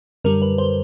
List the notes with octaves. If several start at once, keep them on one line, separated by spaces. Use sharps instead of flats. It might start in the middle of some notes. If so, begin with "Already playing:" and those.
F#2 D3 G3 A#4
B4
C5